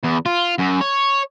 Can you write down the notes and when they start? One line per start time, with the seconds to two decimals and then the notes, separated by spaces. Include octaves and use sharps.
0.04 E2
0.26 F4
0.58 F#2
0.81 C#5